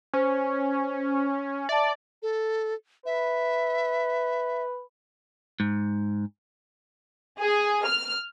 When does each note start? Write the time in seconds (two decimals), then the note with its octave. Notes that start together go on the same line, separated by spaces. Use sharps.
0.14 C#4 C5
1.69 D5 E5 A5
2.22 A4
3.06 B4 E5
5.60 G#2
7.40 G#4
7.86 F6